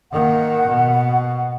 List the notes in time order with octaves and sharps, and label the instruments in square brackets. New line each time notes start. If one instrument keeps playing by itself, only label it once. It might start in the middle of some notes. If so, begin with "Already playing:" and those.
[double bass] D#3 A#3 [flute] F#5
[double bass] B2